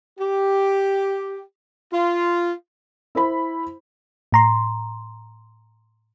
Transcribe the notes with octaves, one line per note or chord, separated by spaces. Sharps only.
G4
F4
E4 C5 B5
A2 A#5 C6